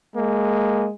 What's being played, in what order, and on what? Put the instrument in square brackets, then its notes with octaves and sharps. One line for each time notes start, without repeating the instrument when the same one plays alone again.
[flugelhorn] G#3 [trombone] A#3